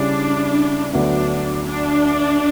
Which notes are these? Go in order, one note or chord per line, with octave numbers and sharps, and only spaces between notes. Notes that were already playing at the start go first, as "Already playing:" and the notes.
Already playing: C#3 G3 C#4 D4 E4
D2 D3 F#3 B3 D4
D4